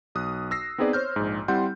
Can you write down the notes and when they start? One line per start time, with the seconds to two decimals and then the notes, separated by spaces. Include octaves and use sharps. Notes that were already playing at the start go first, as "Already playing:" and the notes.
0.15 B1 D#6 F#6
0.51 E6 A#6 C7
0.78 B3 C4 D#4 G#4 B4 D5
0.93 C5 C#5 F6 G6
1.16 A#1 G#2
1.48 G3 C4 E4 F#5 C6 G6